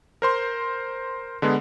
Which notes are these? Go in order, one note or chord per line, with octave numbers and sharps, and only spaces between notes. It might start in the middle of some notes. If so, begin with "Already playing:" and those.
A#4 C5 C6
D3 G#3 B3